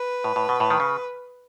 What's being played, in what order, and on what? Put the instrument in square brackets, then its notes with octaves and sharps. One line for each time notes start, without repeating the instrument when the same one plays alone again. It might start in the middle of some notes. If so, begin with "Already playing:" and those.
Already playing: [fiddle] B4
[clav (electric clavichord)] A2
A2
B2
A2
D#3
C#3